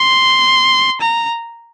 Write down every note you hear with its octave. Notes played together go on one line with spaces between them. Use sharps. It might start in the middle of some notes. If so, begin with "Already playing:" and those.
Already playing: C6
A#5